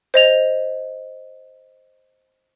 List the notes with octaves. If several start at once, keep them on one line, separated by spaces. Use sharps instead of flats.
C5 D#5 F7